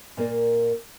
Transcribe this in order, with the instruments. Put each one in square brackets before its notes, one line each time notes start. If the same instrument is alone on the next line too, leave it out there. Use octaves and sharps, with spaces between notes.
[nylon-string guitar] A#2 A#3 A#4 D5